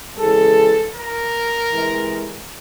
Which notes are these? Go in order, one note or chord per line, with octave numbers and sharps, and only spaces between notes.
C#3 E3 G#3 A4
A#4
C3 E3 G#3